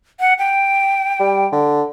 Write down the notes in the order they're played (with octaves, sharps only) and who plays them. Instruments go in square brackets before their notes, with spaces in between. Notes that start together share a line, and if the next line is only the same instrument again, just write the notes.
[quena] F#5
G5
[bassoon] G3
D3